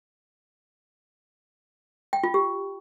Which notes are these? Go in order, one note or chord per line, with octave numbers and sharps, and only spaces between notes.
G5
F4
G4